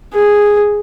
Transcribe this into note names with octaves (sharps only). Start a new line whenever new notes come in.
G#4